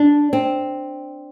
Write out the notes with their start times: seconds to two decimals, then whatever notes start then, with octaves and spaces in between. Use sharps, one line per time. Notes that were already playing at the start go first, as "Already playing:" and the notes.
Already playing: D4
0.33 C4